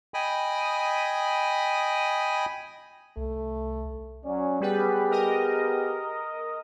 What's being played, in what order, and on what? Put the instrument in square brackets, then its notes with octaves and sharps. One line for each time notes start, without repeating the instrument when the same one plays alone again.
[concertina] D#5 G5 G#5 B5 D#6
[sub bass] C2 [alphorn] A3
[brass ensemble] F#3 C#4 D5
[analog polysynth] G3 B4 [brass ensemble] B3 G4 G#4
[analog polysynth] A#4 D#5